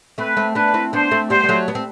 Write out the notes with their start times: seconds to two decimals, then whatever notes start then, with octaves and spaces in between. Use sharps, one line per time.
0.18 A3 C4 B4
0.37 A3 C4
0.55 B3 D4 B4
0.74 C4 E4
0.93 B3 D4 C5
1.11 A3 C4
1.30 G3 B3 C5
1.44 B3
1.49 F#3 A3
1.68 B3
1.75 C4